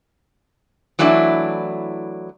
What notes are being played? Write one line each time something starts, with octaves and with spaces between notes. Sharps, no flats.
E3 F#3 A3 D4 E4